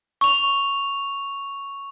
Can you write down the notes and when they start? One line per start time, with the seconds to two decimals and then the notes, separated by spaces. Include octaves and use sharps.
0.21 C#6 F7